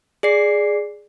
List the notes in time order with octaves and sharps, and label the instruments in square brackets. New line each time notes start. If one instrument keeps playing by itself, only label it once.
[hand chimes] G#4 D5 C7